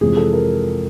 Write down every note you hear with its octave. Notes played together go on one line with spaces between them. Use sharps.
F2 C3 E3 G#3 G#4
A4
A#4